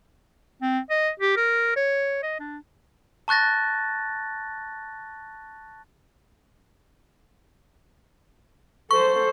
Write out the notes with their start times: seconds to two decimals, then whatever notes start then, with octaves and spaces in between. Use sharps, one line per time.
0.62 C4
0.90 D#5
1.20 G4
1.37 A#4
1.76 C#5
2.23 D#5
2.40 D4
3.28 A5 C#6 F#6 A6 A#6
8.91 A4 C5 C#6